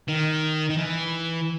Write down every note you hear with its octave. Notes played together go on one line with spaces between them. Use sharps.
D#3
D#3
E3